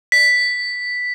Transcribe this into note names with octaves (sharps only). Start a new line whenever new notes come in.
B6